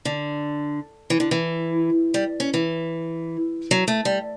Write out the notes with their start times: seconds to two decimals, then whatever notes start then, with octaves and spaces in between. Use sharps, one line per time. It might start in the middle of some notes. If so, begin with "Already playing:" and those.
0.05 D3
1.10 E3
1.20 D3
1.31 E3
2.14 G3
2.40 C#4
2.54 E3
3.71 F#3
3.88 A3
4.05 G3